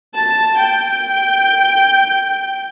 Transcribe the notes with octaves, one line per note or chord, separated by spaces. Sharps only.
A5
G5